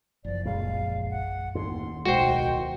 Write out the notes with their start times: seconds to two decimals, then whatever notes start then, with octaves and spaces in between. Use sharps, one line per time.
0.24 F#1 F3 D5
0.45 A#1 G#3 F5
1.10 F#5
1.55 D#2 A2 C6
2.05 D1 B1 B2 D#3 G#3 F#4 C5 G5